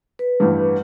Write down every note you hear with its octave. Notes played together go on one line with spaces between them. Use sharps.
B4
A1 G2